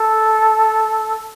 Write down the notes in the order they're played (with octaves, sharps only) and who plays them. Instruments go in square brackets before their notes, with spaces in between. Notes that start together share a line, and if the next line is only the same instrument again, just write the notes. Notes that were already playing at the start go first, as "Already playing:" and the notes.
Already playing: [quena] A4